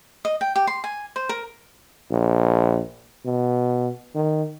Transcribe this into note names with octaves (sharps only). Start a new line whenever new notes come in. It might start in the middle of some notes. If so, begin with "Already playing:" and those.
D#5
G5
G4
C6
G#5
C5
A#4
A#1
B2
D#3